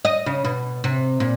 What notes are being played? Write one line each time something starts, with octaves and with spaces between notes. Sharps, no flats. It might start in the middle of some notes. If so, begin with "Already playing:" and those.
D#5
C#3
B2
C3
A#2